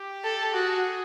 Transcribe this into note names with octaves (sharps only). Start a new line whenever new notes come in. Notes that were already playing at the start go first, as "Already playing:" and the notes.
Already playing: G4
A4
F#4 G#4